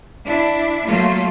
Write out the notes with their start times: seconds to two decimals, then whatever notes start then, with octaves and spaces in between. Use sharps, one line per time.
0.25 D4 E4
0.86 F#3 A3 A#3 F4